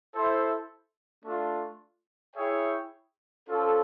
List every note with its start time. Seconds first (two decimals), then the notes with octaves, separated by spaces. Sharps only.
0.13 E4 A4 C5 E5
1.23 A3 D4 F4
2.35 E4 G#4 C#5 E5 G5
3.46 C#4 F4 A4 C5